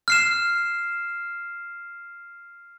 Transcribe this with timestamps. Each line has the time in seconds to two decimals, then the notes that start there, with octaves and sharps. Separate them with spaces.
0.08 F6 C7 E7